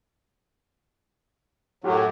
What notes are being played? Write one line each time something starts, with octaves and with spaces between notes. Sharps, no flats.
F#2 A2 F#3 F#4 G4